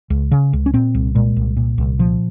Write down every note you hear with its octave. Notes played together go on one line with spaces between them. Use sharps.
C#2
C#3
C#2
C#4
A#2 C4
C2
A#2 G#3
C2
A#2
C2
A#2 F3